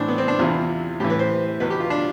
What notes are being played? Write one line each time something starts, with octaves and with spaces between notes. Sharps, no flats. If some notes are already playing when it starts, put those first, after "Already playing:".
Already playing: A2 E3 C4 D4
B3
C4
D4
E2 C3 E3 F4
A2 E3 G4
B4
C5
E2 B2 B4
G4
F4
D4